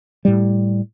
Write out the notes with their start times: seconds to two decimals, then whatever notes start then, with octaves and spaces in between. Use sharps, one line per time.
0.25 A2 G3